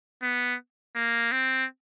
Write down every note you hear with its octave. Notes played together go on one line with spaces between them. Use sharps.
B3
A#3
C4